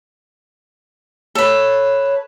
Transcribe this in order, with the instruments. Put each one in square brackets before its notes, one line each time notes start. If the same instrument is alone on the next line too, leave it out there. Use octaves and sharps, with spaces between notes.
[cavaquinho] A4 B4 [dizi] C#5